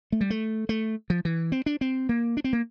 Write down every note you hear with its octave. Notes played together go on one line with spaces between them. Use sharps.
A3
G3
A3
A3
F3
E3
C4
D4
C4
A#3
D4
C4
A#3